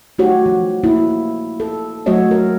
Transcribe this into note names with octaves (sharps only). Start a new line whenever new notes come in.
A3 D#4 F#4 G4 C#5
F3
A#3 E4
A4
F#3 A3 F#4 C#5 D#5 E5
A#4